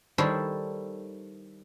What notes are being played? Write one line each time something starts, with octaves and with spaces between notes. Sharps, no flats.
D#3 G3 E4 A4 C5 C#5